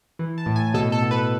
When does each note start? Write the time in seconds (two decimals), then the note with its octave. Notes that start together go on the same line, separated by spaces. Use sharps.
0.19 E3
0.38 A5
0.46 A2
0.56 G#5
0.74 B2 A4
0.92 A4
1.02 B2
1.11 B4